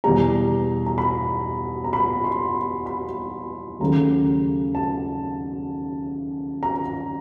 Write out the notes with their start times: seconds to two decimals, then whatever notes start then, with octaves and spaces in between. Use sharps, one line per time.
0.04 E2 B2 G3 A#5
0.87 A#5
0.98 B5
1.84 A#5
1.93 B5
2.24 C6
2.55 B5
2.86 B5
3.80 D#2 C#3 F#3 A3 A#5
4.75 A5
6.63 A#5